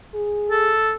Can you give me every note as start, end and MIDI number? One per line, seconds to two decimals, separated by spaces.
0.14 0.72 68
0.50 0.92 69